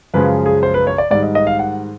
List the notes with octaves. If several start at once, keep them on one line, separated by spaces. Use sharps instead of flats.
F#2 C#3 F3 G#3 B4
G#4
C5
B4
C#5
D5
G#2 D#3 G3 D5
D#5
D#5
F5
F#5